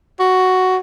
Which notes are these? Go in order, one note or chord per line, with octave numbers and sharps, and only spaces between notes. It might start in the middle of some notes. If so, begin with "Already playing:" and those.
F#4